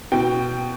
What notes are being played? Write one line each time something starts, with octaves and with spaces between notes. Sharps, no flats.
B2 G5